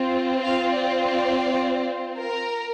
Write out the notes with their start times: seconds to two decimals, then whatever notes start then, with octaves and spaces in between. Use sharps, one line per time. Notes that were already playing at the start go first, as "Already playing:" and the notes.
Already playing: C4 F4
0.43 F5
0.73 D5
1.01 D5
2.19 A#4